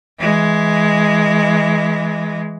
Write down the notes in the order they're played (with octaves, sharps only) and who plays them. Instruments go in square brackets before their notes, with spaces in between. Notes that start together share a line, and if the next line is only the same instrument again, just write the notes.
[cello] E3 G#3